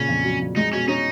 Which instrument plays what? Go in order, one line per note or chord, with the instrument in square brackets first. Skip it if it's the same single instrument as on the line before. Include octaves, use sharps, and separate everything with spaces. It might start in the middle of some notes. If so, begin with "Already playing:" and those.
Already playing: [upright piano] A#2 C#3 [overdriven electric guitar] C#4
[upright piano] F2
F#3
F2
[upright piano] G#3 [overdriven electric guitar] D#4
[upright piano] B2 [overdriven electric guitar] C#4
[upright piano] C#4 [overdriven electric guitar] D#4